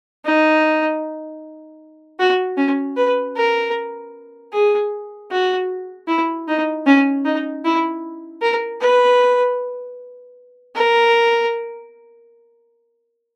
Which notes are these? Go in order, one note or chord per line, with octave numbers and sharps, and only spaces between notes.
D#4
F#4
C#4
B4
A#4
G#4
F#4
E4
D#4
C#4
D#4
E4
A#4
B4
A#4